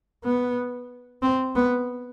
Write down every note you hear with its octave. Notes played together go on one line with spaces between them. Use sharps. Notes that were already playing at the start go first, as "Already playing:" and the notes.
B3
C4
B3